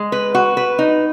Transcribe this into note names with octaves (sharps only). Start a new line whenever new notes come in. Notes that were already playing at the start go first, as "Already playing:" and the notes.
Already playing: G#3
B4
F#4
B4
D#4